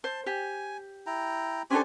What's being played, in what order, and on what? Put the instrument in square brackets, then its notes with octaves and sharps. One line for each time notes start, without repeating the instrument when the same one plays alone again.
[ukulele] C5 [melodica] A5
[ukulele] G4 [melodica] G#5
[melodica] E4 G5 A#5
[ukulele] C#4 D4 A4 [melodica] G4 C5 G#5